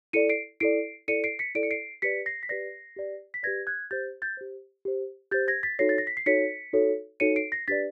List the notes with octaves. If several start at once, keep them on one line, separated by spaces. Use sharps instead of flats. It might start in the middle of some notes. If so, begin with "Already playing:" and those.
E4 A4 D5 C#7 D#7
C7 D7
E4 A4 D5 C7 D7
E4 A4 D5 C#7 D#7
C7 D7
B6 C#7
E4 A4 D5 D7
C#7
C7 D7
G4 B4 D5 B6 C#7
A#6 C7
B6
G4 B4 D5 A#6 C7
G4 B4 D5
B6
G4 B4 D5 G#6 A#6
F#6 G#6
G4 C5 G6 A6
G6 A6
G4 C5
G4 C5
G4 C5 G6 A6
G#6 A#6
A6 B6
D#4 F#4 A4 C#5 A#6 C7
A6
A#6
B6
C7
D#4 F#4 A4 C#5 B6 C#7
D#4 F#4 A4 C#5
D#4 F#4 A4 C#5 C#7 D#7
C7 D7
A#6 C7
D4 G4 B4 D5 A6 B6